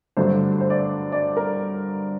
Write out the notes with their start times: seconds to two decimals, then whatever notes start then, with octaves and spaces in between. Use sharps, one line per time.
0.17 G2 D3 F#3 A3 C5
0.61 C5
0.70 D5
1.12 D5
1.37 A#4